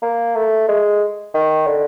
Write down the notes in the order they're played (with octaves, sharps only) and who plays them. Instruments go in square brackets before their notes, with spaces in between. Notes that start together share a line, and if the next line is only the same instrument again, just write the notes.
[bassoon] A#3
A3
G#3
D#3
D3